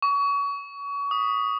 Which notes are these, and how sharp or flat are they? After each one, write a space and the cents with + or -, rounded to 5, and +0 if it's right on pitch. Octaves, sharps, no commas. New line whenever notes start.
C#6 +30
D#6 -5